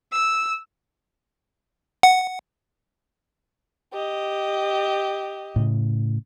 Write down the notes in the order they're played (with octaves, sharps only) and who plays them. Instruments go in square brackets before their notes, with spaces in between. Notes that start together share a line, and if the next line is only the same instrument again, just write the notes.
[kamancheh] E6
[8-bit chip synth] F#5
[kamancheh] G4 D#5
[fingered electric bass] A2 C#3